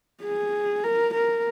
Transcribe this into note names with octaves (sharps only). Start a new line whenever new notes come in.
G#4
A#4
A#4